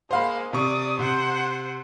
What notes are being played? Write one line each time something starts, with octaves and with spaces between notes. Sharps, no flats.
G#3 A#3 C5 F5 B5
C3 D5 C#6 D#6
C3 C5 F#5